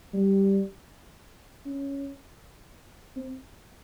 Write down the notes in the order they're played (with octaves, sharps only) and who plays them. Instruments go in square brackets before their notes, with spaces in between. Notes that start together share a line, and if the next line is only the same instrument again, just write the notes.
[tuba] G3
C#4
C4